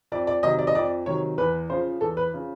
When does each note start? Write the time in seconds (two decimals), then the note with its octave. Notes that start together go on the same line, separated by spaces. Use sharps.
0.12 F2 D5
0.27 D5
0.43 C3 D#3 F#3 D#5
0.59 D5
0.67 D#5
0.75 F2 D5
1.06 C3 D#3 F#3 C#5
1.38 E2 B4
1.70 C#3 F3 C5
2.01 E2 A4
2.17 B4
2.33 C#3 F3